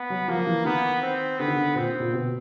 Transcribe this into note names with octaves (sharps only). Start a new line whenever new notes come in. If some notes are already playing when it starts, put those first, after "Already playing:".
Already playing: B3
F#3
F3 A#3
E3
D#3 B3
C4
D3 B3
D#3
D3
A#2 C4
A#2
B2